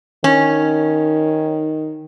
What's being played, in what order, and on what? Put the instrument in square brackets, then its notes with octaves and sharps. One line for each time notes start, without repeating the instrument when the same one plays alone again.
[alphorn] D#3 [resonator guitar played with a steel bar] C#4